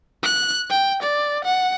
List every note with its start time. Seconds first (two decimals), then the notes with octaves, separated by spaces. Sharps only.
0.23 F#6
0.70 G5
1.02 D5
1.44 F#5